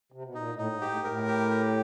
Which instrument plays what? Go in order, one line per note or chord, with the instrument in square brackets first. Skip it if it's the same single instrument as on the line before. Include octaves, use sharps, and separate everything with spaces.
[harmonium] C3
B2
[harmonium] A#2 [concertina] D#4
[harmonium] A2
[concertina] D#4
[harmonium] G#2
[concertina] G4
[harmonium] A2
G#2
[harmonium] A2 [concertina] A#4
[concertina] G4
G4